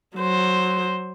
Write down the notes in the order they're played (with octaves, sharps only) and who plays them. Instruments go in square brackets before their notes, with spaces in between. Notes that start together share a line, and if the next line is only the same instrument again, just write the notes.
[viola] F#3 C5